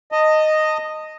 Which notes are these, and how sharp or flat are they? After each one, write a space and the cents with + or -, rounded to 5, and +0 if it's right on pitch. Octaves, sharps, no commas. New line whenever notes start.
D#5 -5 A5 +30